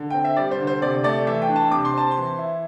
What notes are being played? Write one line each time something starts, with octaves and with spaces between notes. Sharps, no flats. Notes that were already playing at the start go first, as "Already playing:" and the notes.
Already playing: D3
C4 G5
E5
G3 D5
C5
D3
C5
C3 D5
A3 D5
E3 E5
G5
D4
A5
C3 D6
C6
C4 A5
C6
E3
E4